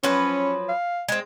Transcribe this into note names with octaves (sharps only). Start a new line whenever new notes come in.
F3 F#3 C#4 B4
F5
G#3 C4